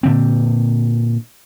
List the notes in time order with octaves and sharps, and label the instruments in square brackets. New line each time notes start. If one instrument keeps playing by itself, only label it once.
[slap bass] A#2 D3 C4